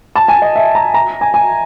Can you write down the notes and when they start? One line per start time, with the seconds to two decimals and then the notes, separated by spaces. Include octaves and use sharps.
0.16 A5
0.28 G#5
0.42 D#5
0.56 E5
0.75 A#5
0.94 A#5
1.21 G#5
1.34 G#5